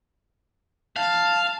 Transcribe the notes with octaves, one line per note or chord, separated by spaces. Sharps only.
F5 A5